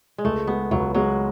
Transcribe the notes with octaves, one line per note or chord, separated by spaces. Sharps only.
G#3
C#2 A3
G#3 B3
C#2 F#3
F#3 G#3